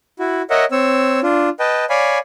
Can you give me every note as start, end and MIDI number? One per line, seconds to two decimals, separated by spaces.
0.19 0.42 64
0.19 0.42 66
0.50 0.65 70
0.50 0.65 73
0.50 0.65 75
0.50 0.65 76
0.50 0.65 78
0.72 1.20 60
0.72 1.20 73
0.72 1.20 88
1.23 1.49 62
1.23 1.49 65
1.60 1.85 71
1.60 1.85 75
1.60 1.85 79
1.60 1.85 81
1.90 2.19 73
1.90 2.19 74
1.90 2.19 77
1.90 2.19 80
1.90 2.19 83